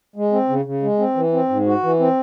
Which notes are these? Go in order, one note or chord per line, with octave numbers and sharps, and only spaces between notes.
G#3
C4
C#3
C#3
G#3
C4
E3
C4
G#2
F#4
E3
C4